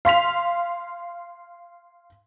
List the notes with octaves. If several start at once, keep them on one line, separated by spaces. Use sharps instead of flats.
F5 C6 B6 F7